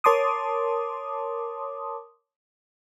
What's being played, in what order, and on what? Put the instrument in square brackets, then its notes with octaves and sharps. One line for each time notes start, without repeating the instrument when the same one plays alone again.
[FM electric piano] A#4 C#5 A5 C6 D6 D#6